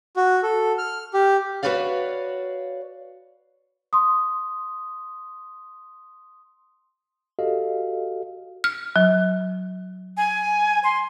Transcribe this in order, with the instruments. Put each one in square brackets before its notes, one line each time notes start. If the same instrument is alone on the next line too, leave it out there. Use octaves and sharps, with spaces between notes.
[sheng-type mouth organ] F#4
A4
F6
G4
[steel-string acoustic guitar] F#4 A4 B4 C#5 D5 F5
[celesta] C6 D#6
[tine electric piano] F#4 G4 A4 D#5 F5
[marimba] F6
F#3
[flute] G#5
C6